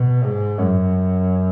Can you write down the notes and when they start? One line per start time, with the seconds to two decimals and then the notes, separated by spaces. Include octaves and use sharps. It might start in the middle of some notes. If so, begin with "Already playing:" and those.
Already playing: B2
0.24 G#2
0.58 F#2